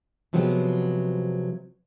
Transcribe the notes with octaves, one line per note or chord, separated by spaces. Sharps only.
C3 F3 F#3 G#3 B3 C4